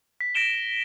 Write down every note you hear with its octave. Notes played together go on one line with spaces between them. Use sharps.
B6
A#6 B6 D7 E7 G7